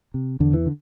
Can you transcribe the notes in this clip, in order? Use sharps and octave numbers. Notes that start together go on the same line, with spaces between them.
C3
E2 D3
E3
D3